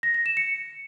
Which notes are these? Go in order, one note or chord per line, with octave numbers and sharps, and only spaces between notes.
A#6
A#6
E7
C#7